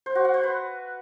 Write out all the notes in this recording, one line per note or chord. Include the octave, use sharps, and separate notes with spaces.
C5
F#4
F#5
C5
B4